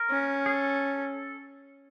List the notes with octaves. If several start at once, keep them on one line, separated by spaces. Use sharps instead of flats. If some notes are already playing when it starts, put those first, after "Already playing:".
Already playing: A#4
C#4
G#4
A4